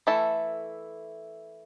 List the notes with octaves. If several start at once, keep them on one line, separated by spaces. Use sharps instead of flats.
E3 A3 E4 A4